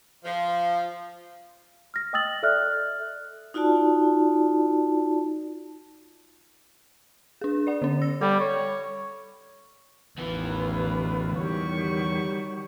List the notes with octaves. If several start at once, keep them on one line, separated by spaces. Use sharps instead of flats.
F3
F6 A#6
D#5 G5 D#6 E6 A6 F#7
A4 D5 E5 F6 F#6
D#4 F4 F#4 D5 A5
D4 G#4
D5 F#5
D3 C#4
E6 A#6
G3 A4 B5
C#5
A1 E2 D#3 E3 F4 B4
D#3 G3 F#4 G4 C#5 C#6